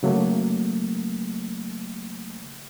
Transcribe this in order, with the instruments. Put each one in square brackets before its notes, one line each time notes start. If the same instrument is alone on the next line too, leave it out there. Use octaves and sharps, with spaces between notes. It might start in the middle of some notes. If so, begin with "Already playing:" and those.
[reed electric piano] C#3 F#3 A3 A#3